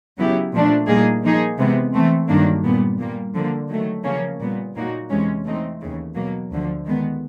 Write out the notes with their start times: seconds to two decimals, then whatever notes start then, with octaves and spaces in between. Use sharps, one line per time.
0.17 C#3 F#3 B3 E4 G4
0.54 A#2 F3 A3 D4
0.88 A#2 G3 A#3 D#4 G#4
1.23 F3 A#3 D#4 G#4
1.58 C3 E3 G#3 B3
1.93 E3 A3 C4
2.28 G2 D#3 F#3 A#3 D4
2.64 A#2 G3 B3
2.99 A#2 G3 A#3
3.34 D3 F3 A#3
3.69 D#3 F#3 A3
4.04 C#3 F3 A#3 C#4
4.39 A#2 G3 B3
4.75 A#2 F#3 A#3 D#4 F#4
5.10 E2 C3 E3 G#3 C#4
5.44 E3 A3 C4 D#4
5.80 D#2 C#3 E3
6.15 B2 F#3 A#3
6.50 D2 D3 F3
6.85 D#3 G#3 B3